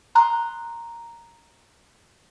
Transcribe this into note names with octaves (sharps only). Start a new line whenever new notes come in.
A#5 C6 D#6 F#6